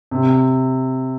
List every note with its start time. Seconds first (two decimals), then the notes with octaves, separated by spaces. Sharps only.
0.11 C3